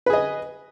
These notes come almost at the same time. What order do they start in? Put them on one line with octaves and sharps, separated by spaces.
B4 G#4 D#5